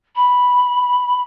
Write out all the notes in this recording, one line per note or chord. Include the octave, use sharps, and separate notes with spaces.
B5